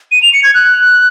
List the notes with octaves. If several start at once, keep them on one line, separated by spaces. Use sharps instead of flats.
D#7
F7
C#7
G#6
F#6